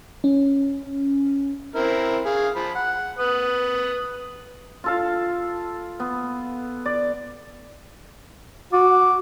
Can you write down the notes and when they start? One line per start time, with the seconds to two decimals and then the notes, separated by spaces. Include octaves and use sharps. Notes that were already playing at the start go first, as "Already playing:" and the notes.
0.24 C#4
1.75 C4 E4 A#4
2.25 G#4 F5
2.55 F3 B5
2.75 F#5
3.19 B4 D#6
4.84 F4 A4 F5
6.00 B3
6.86 D5
8.73 F#4 D6